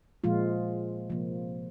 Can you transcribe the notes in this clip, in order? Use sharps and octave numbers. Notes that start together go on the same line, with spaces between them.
A#2 F3 G#3 F4
C3 F3 A#3